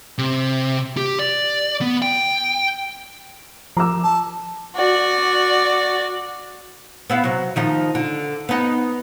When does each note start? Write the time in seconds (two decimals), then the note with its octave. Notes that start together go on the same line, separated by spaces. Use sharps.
0.18 C3
0.97 G4
1.19 D5
1.81 B3
2.02 G5
3.77 F3 A#5 D6 E6
4.04 A5
4.76 F#4 D5
7.10 B3 E4 F5
7.24 C3 F#3
7.56 D#3 F3 D#4
7.95 D3
8.49 B3 D#4